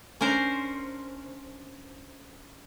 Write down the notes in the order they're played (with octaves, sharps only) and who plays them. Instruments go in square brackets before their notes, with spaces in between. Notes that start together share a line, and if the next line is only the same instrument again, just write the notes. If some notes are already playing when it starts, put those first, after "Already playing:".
[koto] C#4 D4 A#4 C5